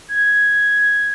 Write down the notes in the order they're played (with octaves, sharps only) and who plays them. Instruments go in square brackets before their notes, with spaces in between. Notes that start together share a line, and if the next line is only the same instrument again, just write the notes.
[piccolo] G#6